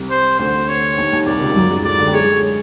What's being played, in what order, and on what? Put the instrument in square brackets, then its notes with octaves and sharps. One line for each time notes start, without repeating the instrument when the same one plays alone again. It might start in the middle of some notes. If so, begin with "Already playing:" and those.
Already playing: [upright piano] C2 C3
[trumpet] C5
[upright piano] D2 D3 [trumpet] C5
[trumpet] C#5
[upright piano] D#2 D#3
D#2 D#3
[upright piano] C2 C3 [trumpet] D5
[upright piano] C#2 C#3
F#2 F#3
G#2 G#3
[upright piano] A2 A3 [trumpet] D5
[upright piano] D3 D4
G4
[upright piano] G#3 G#4 [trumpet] C#5